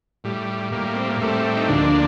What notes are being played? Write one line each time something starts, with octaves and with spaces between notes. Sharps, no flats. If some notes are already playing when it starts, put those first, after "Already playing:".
A2 G3
A2 G3 A#3
C4
A#3
A2 G3 A3 C4
D#4
D2 D3 F3 A#3 D4